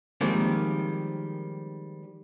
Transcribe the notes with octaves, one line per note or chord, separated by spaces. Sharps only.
D#3 F3 G3 G#3 A#3 C4